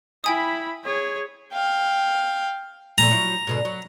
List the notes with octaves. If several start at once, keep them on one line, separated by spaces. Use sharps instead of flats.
E4 G5 G#5 B5 D#6
G#4 C#5
F5 G5
A#2 F3 A3 A#5
F3 F#3 E4
G#2 B2 D3
F#3